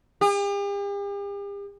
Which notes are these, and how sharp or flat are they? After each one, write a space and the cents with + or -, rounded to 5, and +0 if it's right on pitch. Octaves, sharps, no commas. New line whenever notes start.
G4 +45